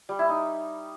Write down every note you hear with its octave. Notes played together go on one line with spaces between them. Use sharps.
G3
E4
D#4